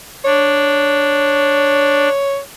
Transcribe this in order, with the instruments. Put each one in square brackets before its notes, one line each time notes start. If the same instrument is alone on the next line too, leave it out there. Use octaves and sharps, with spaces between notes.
[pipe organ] D4 [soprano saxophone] C#5